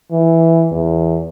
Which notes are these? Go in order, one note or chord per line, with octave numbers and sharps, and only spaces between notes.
E3
E2